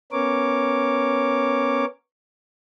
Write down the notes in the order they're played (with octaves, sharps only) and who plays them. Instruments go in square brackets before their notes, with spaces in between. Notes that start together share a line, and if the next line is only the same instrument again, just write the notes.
[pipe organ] B3 C#4 A#4 C#5 D6